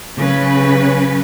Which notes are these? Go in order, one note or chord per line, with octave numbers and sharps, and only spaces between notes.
C#3 F#3 C#4 B4